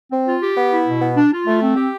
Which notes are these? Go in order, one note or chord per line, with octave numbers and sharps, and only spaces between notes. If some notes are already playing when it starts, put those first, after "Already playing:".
C4
F4
G4
B3
E4
B2
B3
D4
F4
A3
C4
G4